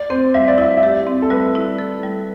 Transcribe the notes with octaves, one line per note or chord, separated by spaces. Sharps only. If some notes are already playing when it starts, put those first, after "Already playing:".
Already playing: D5
C4 C5
G3 E5
D5
E4 E5
E5
G4 D5
C4
A4
G3 B4
E4
A4
G3